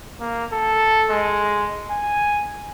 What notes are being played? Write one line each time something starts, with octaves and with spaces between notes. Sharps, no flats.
A#3
A4
G#3
G#5